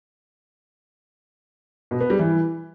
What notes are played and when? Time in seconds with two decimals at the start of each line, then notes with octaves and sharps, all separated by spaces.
1.91 B2
2.00 B3
2.10 G3
2.19 E3